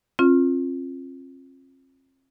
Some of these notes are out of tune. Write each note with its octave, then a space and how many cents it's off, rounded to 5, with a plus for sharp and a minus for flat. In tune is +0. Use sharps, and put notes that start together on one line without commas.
C4 +45 F4 +0